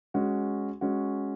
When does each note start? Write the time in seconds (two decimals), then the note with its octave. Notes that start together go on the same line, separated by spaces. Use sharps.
0.14 G#3 C#4 F#4
0.81 G#3 C#4 F#4